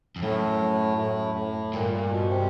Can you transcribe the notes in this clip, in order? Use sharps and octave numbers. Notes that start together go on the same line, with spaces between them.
F2
F#2 A2
A2
A2
G2 A#2
A#2
B2
C3